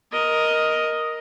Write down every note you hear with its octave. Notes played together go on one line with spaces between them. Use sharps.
A#4 D#5